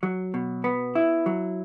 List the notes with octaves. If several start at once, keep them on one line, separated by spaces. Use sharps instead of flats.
F#3
B2
B3
E4
F#3